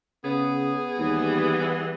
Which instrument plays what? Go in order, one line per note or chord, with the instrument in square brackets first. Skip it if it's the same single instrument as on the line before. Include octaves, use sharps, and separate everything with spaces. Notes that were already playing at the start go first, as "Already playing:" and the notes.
[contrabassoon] C#3 [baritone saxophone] B3 [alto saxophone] G#4
[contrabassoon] D#2 [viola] E3 G3